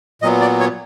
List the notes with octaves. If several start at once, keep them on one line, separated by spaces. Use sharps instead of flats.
A#2 F#3 B3 D#5
D5
C#5